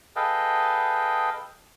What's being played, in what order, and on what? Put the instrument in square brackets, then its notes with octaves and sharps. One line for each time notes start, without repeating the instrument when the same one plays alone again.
[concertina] G#4 A4 B4 D#5 F5 G5